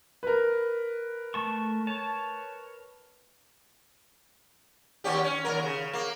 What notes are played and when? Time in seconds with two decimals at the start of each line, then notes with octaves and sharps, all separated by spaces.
0.23 A#4 B4
1.34 A3 A5 C#6
1.87 C#5 A5
5.04 D#2 C#4 G4
5.24 C#4
5.45 D#2 D3 A#4
5.62 C#3
5.93 A#3